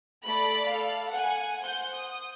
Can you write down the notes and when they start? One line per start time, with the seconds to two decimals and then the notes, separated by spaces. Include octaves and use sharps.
0.23 A3 D5 B5
0.67 A4 F5
1.10 F#5 G#5
1.61 C5 F#5 G6
1.97 D#6